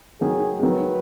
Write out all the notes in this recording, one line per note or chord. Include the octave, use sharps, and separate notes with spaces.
D#3 F#3 G#4
G#3
D#3 F#3 B4